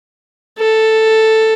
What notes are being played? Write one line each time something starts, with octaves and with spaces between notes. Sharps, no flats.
A4